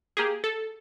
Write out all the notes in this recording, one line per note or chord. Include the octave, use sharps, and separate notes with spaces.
A#3 G4 G#4
A4